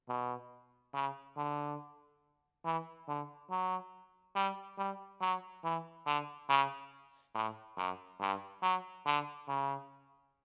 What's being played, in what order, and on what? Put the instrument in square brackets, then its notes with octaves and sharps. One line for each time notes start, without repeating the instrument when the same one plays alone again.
[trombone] B2
C#3
D3
E3
D3
F#3
G3
G3
F#3
E3
D3
C#3
A2
F#2
G2
F#3
D3
C#3